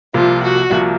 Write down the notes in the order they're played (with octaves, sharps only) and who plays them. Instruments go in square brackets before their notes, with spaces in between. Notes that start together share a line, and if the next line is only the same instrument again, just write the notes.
[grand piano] C2 C3 F3 A#3 [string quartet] F4
[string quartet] F#4
[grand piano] C2 C3 F3 A#3